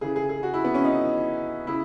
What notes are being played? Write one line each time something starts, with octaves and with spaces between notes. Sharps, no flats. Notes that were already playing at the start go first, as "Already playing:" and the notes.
C#3 E3 G#4
G#4
G#4
F#4
E4
B3
C#4
D#4
C#3 E4